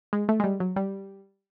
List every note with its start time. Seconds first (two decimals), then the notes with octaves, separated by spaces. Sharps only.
0.13 G#3
0.29 A3
0.40 G#3
0.44 G3
0.60 F#3
0.76 G3